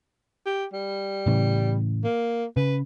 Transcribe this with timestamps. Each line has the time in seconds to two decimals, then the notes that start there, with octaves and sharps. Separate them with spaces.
0.46 G4
0.73 G3
1.27 A2 C#3 E3
2.04 A#3
2.57 C#3 B4